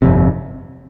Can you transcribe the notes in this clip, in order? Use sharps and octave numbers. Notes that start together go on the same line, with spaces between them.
G1 F2 C3